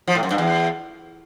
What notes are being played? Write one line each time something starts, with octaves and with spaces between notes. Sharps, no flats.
F3
A2
F#2
G2
E2